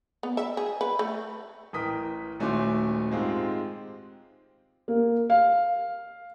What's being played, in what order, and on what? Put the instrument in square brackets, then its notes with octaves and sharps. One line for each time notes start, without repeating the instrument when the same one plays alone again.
[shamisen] B3
E5
G#4
B4
A3
[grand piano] A1 A#4 G5 D#6 B6
D#1 A3 C#4 F#4 C6 D6
G#2 G#3 C4 F4 G4 G#4
[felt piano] A#3
F5